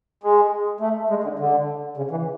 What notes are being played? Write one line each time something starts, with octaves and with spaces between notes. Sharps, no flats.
G#3
A3
G#3
D3
D3
C#3
E3